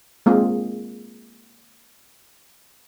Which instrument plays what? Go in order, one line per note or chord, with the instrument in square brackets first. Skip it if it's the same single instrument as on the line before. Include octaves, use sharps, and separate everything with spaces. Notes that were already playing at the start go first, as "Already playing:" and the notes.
[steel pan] G#3 A#3 C4 F4 G#4